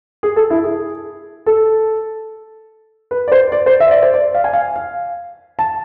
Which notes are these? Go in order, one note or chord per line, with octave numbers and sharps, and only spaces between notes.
G#4
A4
E4
G#4
A4
B4
D5
C5
D5
C5
E5
D5
C5
D5
F5
G#5
F5
F5
A5